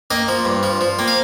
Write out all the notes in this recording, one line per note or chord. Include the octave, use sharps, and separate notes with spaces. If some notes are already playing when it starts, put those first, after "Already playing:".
A#3 D#5 G5
F3
G2
F3
F3
A#3 G5
F5